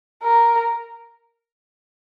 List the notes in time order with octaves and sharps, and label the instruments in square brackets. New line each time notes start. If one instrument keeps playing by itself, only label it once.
[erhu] A#4